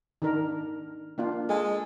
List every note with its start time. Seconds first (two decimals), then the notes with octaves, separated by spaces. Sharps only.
0.22 D#3 D4 A#4
1.18 A#3 D4 F4
1.49 G#3 A4